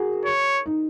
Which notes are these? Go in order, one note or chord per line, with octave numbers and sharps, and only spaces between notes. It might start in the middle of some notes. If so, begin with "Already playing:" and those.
Already playing: F#4 G#4 A#4
C#5
D#4